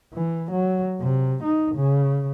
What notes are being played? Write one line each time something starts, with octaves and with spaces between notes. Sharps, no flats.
E3
F#3
C3
D#4
C#3